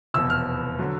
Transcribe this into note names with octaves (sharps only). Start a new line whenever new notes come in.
F1 E2 B2 E6
F6
D3 F#3